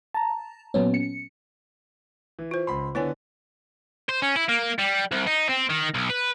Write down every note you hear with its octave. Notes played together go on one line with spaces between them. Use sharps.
A5 A#5
A#2 F#3 B3 C#4
C#7
E3
F4 C5
C#2 B5 C6
D3 B3 E4 C#5 G#5
C5
C#4
E4
A#3
G3
C2
D#4
C4
D#3
B1
B4